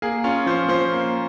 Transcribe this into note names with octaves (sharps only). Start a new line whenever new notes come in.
A#3 G#4
C#4 F4
F3 C5
F3 C5
A#3